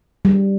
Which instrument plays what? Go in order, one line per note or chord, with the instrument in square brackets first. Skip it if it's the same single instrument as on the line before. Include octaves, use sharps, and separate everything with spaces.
[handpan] G3